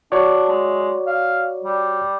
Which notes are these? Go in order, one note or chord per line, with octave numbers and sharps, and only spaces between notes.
D4 F#4 C#5 D5
G#3
F5
G3